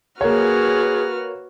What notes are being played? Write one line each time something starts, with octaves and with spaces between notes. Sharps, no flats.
A#3 F#4 G#4 B4 C#5 F6